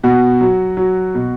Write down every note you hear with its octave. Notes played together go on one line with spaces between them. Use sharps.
B2 F#4
F#3
F#3
B2